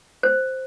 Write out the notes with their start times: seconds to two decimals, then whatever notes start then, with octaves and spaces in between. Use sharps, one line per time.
0.23 C5